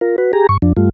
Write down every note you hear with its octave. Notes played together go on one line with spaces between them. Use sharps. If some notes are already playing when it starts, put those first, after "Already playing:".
F4 A#4
F#4 B4
G4 G#4 A#5
G2 C#6
F2 F3 D4
G2 G3 A3 F4